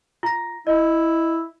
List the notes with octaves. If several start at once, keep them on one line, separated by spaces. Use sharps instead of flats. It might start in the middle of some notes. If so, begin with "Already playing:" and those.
F4 A#6
E4 D#5